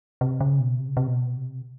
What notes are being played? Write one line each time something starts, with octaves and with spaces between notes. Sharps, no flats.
C3
C#3
B2
C3
C#3
C3
B2
C3